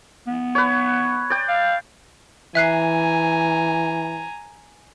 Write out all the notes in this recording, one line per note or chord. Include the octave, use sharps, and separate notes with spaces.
B3
B4 C#5
D5 G5
F5
E3 E5 G#5 A#5 F#6 C7